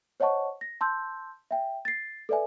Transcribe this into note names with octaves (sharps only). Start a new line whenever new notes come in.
C5 C#5 D#5 F#5 A5 C#6
A#6
A5 C6 E6 G6
E5 G5
A6 C7
A4 B4 D5 E5 G#5